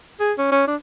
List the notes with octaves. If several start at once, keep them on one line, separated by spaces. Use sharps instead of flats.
G#4
C#4
C#4
D4